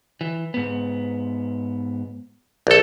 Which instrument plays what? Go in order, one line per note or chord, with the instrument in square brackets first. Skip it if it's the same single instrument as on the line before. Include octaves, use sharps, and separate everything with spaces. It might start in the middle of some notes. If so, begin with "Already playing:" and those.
[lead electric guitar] E3
G#2 B3
[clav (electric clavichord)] A#1 A4